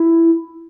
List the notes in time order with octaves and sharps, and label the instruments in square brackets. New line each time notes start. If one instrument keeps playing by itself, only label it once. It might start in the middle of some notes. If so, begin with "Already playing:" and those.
Already playing: [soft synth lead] E4